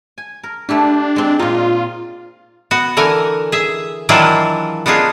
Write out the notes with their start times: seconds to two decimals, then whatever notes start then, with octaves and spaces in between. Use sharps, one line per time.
0.18 G#5
0.43 A#4
0.69 A3 D4 E4 G4
1.16 G#3 C4
1.39 A#2 D#4 F4
2.71 B3 F#4
2.97 D3 E3 A#4 G#5
3.52 G#4 E5
4.09 D#3 E3 F#3 D4 E4 F4
4.86 B3 D4 D#4 F4 G#4